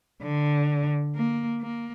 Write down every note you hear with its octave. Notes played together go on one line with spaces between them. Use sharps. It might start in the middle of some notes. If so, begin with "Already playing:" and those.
D3
A#3
A#3